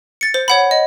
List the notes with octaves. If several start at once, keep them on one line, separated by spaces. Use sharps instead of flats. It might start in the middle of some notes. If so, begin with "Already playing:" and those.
A6 C#7
C5
C#5 F#5 B5
D#5